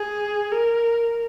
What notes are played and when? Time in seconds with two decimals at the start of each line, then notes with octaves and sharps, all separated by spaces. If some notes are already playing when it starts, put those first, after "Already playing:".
Already playing: G#4
0.52 A#4